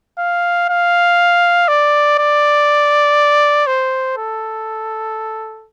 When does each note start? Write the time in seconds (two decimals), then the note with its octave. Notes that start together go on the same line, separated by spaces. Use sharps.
0.19 F5
0.69 F5
1.68 D5
2.19 D5
3.67 C5
4.17 A4